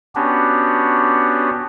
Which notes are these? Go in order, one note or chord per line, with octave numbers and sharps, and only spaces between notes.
B3 C#4 D4 F#4 G4